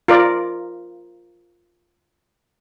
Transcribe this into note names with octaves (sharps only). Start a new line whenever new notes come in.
F4 A#4 D5